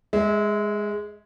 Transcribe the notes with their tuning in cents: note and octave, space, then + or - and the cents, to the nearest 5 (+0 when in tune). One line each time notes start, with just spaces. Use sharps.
G#3 -5 E5 -35